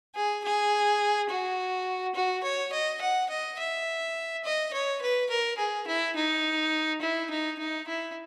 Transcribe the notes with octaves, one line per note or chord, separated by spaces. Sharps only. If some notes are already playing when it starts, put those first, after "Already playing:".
G#4
G#4
F#4
F#4
C#5
D#5
F#5
D#5
E5
D#5
C#5
B4
A#4
G#4
E4
D#4
E4
D#4
D#4
E4